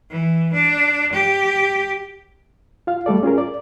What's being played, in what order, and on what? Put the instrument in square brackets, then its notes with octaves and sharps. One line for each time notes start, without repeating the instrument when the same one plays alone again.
[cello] E3
D4
G4
[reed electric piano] F4 F5
G3 A3 A4 D5
C#4 F4 G#4 A#4
D5